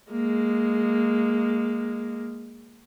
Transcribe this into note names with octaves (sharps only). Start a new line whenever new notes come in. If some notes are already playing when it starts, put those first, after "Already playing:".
G#3 A#3